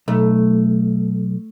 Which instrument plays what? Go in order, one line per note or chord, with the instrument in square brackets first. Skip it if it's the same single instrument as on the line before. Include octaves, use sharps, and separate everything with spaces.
[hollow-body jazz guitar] B1 [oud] A3